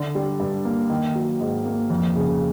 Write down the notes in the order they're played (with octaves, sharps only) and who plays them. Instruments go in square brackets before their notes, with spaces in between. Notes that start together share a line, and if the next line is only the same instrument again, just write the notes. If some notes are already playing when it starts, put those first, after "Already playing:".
Already playing: [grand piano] D3
G3
G2
A#3
D#3
F#3
G#2
A#3
F2
C#3